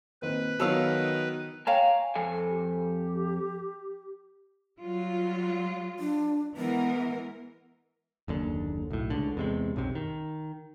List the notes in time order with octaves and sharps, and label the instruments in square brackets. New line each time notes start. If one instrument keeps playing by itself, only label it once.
[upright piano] A#2 D#3 C4 [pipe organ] B4
[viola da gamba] D#3 [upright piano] F#3 B3 E6 [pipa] A4 C#5 F5
[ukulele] C#5 F5 G5 [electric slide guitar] G#5 A#5
[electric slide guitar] F2 A4 G#5
[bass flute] G4
[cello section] F#3 G3 F4
[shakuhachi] D4
[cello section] E3 G#3 A#4 [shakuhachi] B3
[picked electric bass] F#1 D#2 D3
B1 A2
C#2 D3
E2 C3 G#3
B1 F#2 C3
D#3